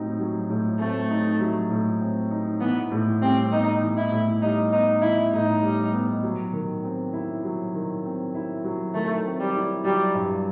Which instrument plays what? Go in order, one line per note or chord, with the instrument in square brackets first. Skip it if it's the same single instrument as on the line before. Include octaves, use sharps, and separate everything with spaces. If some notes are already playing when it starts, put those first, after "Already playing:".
Already playing: [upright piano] A2 F#3 C4 D#4
F#3
A2
[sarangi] A3 [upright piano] C4
[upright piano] D#4
F#3
A2
C4
D#4
[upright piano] E3 [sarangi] B3
[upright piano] A2
[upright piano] G3 [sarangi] C4
[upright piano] B3 [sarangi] D#4
[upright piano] E3
[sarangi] E4
[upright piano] A2
[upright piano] G3 [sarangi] D#4
[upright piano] B3 [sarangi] D#4
[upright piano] E3 [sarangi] E4
[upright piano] A2 [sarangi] D#4
[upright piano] G3
B3
F#3
D#3
C4
E4
F#3
D#3
C4
E4
F#3
[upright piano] D#3 [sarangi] A3
[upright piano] C4
[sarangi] G3
[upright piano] E4
[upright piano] F#3 [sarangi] G3
[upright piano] G2